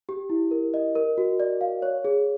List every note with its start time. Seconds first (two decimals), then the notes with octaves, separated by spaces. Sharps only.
0.09 G4
0.30 E4
0.51 A#4
0.74 D#5
0.95 A#4
1.18 F#4
1.40 D5
1.61 F5
1.82 C#5
2.05 G#4